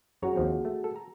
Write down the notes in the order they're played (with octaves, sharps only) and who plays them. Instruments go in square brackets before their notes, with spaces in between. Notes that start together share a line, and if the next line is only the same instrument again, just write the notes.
[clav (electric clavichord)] F#2 C#5 A#5 [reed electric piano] F#4 G#4
[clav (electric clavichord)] D#2 F3 C4
A3
A4
A#5